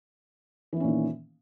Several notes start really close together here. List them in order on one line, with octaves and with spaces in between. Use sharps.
E3 B3 C#4 A#2 D#3